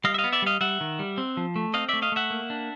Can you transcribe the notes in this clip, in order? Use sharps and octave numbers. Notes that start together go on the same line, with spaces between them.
G3 D#5 F5
E5
D#5 F5
B3
D5 E5
G3 D#5 F5
G3 E5 F#5
D#3
G3
C4
F3
A3
C4 D#5 F5
A3 D5 E5
D#5 F5
A3 E5 F#5
A#3
D4